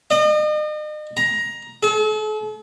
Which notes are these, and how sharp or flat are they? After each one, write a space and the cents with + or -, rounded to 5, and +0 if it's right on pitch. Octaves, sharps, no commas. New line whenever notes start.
D#5 -40
A#5 +15
A4 -45